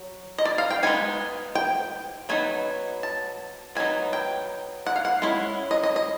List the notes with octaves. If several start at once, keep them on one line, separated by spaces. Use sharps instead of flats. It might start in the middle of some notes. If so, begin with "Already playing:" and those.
Already playing: F#3
D#5
D5
F5
G5
G#3 B3 D#4 G#5
G5
F#3 B3 D#4 G#5
A5
F#3 B3 D#4 G#5
G5
F#5
F5
F#5
G#3 C#4 E4
D#5
D#5
D#5